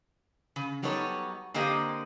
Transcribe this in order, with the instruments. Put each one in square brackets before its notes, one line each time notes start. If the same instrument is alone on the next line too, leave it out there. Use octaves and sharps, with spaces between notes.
[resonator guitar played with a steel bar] C#3
F#3 G3 B3 D#4 A4 C#5
D3 A#3 C4 G4 D#5